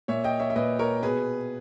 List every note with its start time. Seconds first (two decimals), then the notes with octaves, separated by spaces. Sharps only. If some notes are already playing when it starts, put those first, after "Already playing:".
0.08 A#2 C#5 E5
0.24 D#5 G5
0.40 C#5 E5
0.50 E5
0.56 A#2 B4 D#5
0.79 A#4 C#5
1.03 B2 G#4 B4